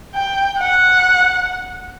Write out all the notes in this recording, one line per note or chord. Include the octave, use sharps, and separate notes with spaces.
G5
F#5